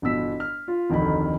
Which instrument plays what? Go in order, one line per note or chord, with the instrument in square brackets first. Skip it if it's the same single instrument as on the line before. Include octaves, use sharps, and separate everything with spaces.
[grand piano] G1 B2 E3 E6 B6
F6
F4
F1 D2 D#3 E3 B5